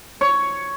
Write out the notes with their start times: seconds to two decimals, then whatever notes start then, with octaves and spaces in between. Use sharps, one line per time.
0.21 C#5